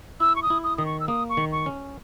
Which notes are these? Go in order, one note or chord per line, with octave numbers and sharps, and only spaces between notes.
E4 E6
C#6
D#6
E4
D#6
D#3 D#6
C#6
E6
A#3 D#6
C#6
D#3
C#6
C#4